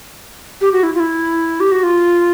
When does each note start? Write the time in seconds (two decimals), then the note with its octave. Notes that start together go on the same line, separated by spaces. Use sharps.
0.61 G4
0.73 F#4
0.83 E4
0.95 F4
1.00 E4
1.60 G4
1.72 F#4
1.83 F4